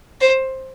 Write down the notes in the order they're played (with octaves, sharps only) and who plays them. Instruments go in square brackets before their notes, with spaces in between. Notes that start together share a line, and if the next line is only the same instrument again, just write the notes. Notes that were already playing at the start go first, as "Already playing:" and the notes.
[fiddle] C5